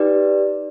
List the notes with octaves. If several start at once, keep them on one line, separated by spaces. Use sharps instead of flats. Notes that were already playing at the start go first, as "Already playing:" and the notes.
Already playing: D#4 G4 B4 D5